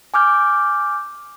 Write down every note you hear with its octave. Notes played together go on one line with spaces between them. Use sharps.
G#5 D6 F6 G6